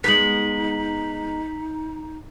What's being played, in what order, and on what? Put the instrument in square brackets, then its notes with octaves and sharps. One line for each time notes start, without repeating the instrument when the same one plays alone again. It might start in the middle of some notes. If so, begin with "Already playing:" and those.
[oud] G#3 B3 [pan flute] D#4 [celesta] B6 F#7